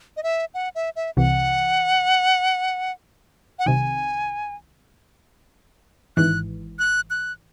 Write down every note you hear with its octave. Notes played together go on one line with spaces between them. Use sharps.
D#5
E5
F#5
E5
E5
C2 C3 E3 F#5
F#5
C2 C3 D#3 G#5
G#1 G#2 E3 F#6
F#6
F#6